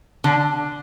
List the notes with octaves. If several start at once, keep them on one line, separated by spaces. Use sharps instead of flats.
D3